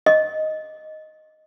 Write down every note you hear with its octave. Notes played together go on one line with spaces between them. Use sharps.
D#5